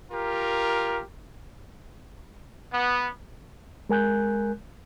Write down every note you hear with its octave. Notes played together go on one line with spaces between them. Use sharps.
F4 G4 A#4
B3
G#3 A#4 G#5 F#6 G6